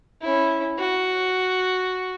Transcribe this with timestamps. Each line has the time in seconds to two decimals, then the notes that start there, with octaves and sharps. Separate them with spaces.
0.22 C#4 E4
0.78 F#4